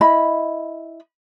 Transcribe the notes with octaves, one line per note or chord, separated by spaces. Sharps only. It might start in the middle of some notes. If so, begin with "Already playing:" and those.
E4 D#5 B5